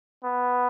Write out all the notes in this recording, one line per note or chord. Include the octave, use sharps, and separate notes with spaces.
B3